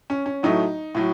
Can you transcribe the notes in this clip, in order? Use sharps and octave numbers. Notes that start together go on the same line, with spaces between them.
C#4
C#4
A2 F#3 A3 D#4
A2 F#3